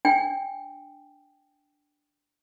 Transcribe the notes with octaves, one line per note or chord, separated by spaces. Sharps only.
D4 G5 G#5